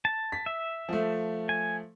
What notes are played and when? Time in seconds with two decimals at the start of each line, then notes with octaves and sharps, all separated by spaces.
0.05 A5
0.32 B6
0.46 E5
0.89 F3 A3
1.49 G#5